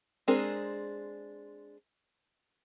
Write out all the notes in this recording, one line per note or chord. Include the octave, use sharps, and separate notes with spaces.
G#3 C4 D4 G#4 A#4